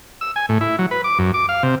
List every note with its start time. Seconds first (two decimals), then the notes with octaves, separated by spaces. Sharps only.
0.21 E6
0.36 G#5
0.49 A2
0.61 E4
0.78 F#3
0.91 B4
1.04 D6
1.19 F#2
1.34 D6
1.49 F5
1.63 C3